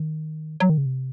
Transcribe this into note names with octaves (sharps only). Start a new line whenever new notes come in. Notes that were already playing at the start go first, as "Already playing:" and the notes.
Already playing: D#3
F#3
D#3
C#3
C3